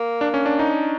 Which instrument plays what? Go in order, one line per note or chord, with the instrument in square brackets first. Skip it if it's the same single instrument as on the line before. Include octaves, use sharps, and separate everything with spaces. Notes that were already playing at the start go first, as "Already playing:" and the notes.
Already playing: [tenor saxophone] A#3
[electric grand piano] D4
C#4
D4
D#4